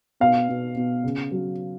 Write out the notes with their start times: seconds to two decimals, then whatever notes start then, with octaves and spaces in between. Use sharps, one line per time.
0.20 B2 F5
0.49 B2
0.76 B2
1.04 C#3
1.31 F#3